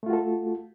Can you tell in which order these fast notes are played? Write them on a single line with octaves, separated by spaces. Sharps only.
A3 F4 F#4 A4